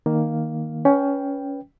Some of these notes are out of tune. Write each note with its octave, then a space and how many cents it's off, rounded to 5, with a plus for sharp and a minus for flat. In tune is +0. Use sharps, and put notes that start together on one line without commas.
D#3 +0 A#3 +0 F5 +0
C#4 +15 B4 +0 G5 +0